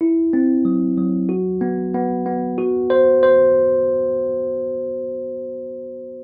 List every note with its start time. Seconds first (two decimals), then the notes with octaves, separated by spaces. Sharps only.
0.01 E4
0.33 C4
0.65 F#3
0.98 F#3
1.29 F#4
1.61 B3
1.94 B3
2.26 B3
2.58 F#4
2.90 C5
3.23 C5